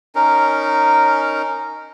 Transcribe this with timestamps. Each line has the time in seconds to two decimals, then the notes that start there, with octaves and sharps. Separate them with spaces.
0.15 C#4 D#4 A#4